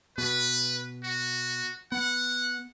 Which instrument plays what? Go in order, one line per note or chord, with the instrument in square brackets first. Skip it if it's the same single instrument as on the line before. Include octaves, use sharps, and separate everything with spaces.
[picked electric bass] B2 [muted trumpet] B4
[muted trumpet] F#4
[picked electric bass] B3 [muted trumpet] F#5